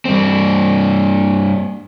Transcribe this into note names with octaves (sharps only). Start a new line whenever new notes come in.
G2 C4